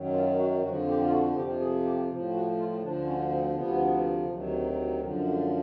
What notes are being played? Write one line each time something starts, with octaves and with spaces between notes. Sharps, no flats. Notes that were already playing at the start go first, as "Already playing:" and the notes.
Already playing: F#2 D#3 F#3
F4
F#4
F2 D3 F3 F#4
G4
F4
F#4
F2 C3 F3 G4
G#4
G4
A2 F3
F#4
F4
D2 D3 F3 D4
C#4
C4
D2 C3 F3 B3
D2 C3 D#3 F#3
F#2 D3 F3 A#3
A3
G#3
A3